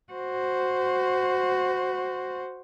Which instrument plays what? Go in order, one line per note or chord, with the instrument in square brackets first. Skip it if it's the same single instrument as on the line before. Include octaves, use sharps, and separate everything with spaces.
[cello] F#4 C5